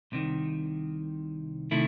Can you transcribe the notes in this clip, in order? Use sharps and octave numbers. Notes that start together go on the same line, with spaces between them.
C2 C3 D#3
C3 D#3 A3 E4